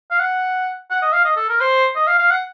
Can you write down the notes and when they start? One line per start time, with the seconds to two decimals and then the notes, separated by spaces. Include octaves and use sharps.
0.11 F5
0.19 F#5
0.91 F#5
1.02 D#5
1.13 F5
1.25 D#5
1.37 A4
1.49 A#4
1.61 C5
1.96 D#5
2.07 F5
2.19 F5
2.30 F#5